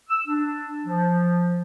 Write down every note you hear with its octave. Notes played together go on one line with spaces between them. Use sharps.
E6
D4
F3